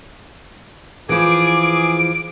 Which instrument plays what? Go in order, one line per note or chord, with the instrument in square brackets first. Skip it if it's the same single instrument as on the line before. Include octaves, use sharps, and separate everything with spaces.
[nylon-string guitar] E3 F3 [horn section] G#4 [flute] D6 [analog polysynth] D7